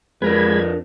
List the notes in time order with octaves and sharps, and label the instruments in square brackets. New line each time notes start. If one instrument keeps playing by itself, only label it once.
[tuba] F2 [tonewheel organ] G#3 B5 G#6 [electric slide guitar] D4 A#4 B4